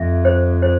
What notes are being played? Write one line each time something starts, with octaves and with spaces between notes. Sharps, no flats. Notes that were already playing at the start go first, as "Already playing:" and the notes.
Already playing: F2 E5
C5
C5